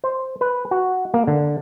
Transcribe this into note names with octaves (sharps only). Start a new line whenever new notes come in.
C5
B4
F#4
A#3
D3